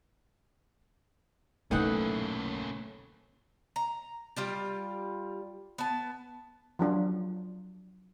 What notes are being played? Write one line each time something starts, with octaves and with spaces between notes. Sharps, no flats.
B1 E3 A3 A#3 C#4 D#4 F4 F#5
A#5
G3 F4 D5
B3 A5
F3 F#3 D4 F4